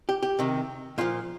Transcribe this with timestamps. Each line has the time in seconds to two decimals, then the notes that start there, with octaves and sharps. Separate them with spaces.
0.09 G4
0.23 G4
0.39 C3 D#3
0.98 A#2 F3 F4